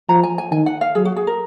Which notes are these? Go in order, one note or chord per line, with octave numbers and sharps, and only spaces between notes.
F3 A#5
G#5
G#5
D#3 G#5
F#5
F5
F#3 G#4
F#4
G#4
A#4